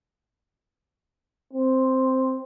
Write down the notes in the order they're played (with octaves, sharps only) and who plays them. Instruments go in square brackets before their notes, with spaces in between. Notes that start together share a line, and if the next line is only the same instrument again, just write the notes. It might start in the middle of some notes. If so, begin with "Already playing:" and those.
[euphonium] C4